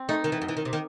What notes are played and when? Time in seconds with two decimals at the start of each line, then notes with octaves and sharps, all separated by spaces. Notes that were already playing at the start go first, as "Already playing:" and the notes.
Already playing: C4
0.09 A3 D#4
0.24 D#3
0.32 E3
0.42 F#2
0.49 E3
0.57 D#3
0.65 C3
0.73 D#3